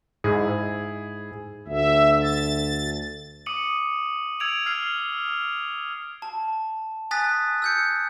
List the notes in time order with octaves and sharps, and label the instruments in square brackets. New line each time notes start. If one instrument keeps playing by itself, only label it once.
[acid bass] G#2 [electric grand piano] E4 G#4
[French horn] D2 [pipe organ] E5
[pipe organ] A6
[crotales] D6 D#6 C#7 D#7 F#7
E6 G#6 D7 F7
F6 C7 F7
[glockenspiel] A5
G#5 D#6 F#6 A6 B6
E6 G6 C#7